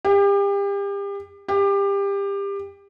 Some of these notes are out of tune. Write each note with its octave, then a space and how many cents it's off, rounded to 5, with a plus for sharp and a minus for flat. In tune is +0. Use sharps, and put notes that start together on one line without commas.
G4 +35
G4 +25